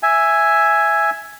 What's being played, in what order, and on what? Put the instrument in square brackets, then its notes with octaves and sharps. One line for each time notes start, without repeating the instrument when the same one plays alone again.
[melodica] E5 G#5